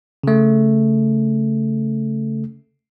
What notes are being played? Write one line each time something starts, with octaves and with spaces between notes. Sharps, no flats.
C#3 A3